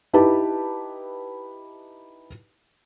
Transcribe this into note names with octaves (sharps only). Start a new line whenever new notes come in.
D#4 E4 G4 B4 A5